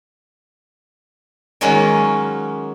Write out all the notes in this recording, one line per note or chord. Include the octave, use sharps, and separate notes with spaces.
D#3 F#3 G#3 A#3 C#4